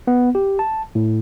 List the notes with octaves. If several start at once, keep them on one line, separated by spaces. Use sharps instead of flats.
B3
G4
A5
A2